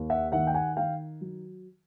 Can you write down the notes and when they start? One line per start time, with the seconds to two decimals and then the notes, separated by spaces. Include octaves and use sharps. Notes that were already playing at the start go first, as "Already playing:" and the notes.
Already playing: D#2
0.10 E5 F#5
0.32 D#3 E5 F#5
0.47 G5
0.54 F#5 G#5
0.76 D#3 F5 G5
1.21 F#3